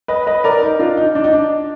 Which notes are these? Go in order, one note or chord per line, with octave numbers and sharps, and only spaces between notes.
B4 D#5
B4 D#5
A#4 D5
D#4
D4 F4
D#4
D4
D#4
D4